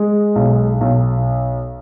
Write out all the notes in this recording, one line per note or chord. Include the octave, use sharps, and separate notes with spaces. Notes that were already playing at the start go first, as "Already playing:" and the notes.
Already playing: G#3
B1
B1